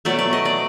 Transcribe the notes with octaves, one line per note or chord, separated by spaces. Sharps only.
B2 F#3 A3 D5
D5
D#5
D5